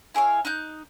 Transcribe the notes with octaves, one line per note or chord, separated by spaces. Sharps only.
E4 G#4 C#5 F5
D#4 F#6 G6